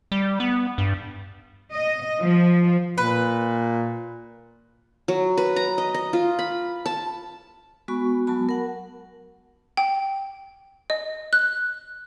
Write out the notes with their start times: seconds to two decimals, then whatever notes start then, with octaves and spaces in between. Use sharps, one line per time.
0.12 G3
0.40 B3
0.78 G2
1.74 D#5
2.20 F3
2.98 A#2 B4
5.08 F#3
5.37 B4
5.56 A#5
5.78 D#5
5.94 D#5
6.13 F4
6.39 B5
6.86 A5
7.88 G#3 B3 F#4 B5 C#6
8.27 F#3 G#3 B3 F#4 A5 B5
8.49 A#4 F#5
9.77 G5
10.90 D#5
11.33 F#6